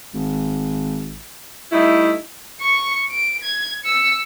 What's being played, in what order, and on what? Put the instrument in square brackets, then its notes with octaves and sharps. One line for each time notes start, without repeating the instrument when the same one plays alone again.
[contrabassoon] G#1
[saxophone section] G3 A3 D#4 E4
[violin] C#6 C#7
D7
G#6
E6 C#7